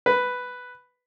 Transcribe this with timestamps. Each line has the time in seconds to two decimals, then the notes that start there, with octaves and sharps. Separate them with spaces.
0.06 B4